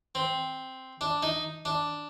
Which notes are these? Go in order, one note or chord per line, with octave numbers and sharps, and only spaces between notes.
C4
D4
D#4
D4